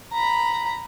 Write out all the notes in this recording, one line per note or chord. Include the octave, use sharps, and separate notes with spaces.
A#5 B5